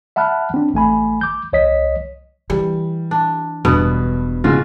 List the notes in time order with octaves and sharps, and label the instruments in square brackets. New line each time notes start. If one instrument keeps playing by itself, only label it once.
[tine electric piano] E5 F#5 A5 B5 F6 F#6
C4 D4
A1 A3 G#5 B5
D6 G6
C2 C#5 D#5 B6
[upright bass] E3 [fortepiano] G3
[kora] D4
[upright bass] E1 [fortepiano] G2 [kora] B2 B3
[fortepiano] G#2 C#3 F3 [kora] F4 F#4